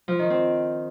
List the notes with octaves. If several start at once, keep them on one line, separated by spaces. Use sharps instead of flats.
F3
D#3
C4